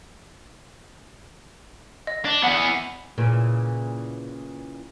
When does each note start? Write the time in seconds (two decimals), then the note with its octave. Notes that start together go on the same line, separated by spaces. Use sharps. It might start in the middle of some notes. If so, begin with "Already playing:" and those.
2.07 D#5
2.25 D4
2.44 E2 B3 F#5
3.18 A#2 C#3 E3